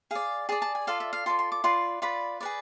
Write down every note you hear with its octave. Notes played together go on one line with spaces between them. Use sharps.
G#4 D5 F5
G#4 D5 A5
A5
G#5
F4 A4 D5 F5
E5
F5
F4 A4 D5 C6
C6
D6
F4 B4 D5 C6
F4 B4 D5 B5
G#4 B4 D5